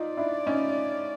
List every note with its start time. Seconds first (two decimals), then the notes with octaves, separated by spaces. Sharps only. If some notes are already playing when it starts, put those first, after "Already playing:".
Already playing: D#4 F4 D5
0.17 D4 E4
0.46 C#4 D#4